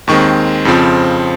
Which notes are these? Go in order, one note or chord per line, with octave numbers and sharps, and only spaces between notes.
D#2 D#3 G#3 C4 C#6
F2 C#3 F3 C4